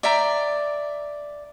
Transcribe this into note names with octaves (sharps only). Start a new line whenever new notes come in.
D5 E5 G5 A#5